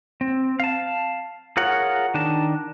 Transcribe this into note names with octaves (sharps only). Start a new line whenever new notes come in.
C4
F5 A5
F4 G#4 A#4 C#5 F#5
D#3 D4 A5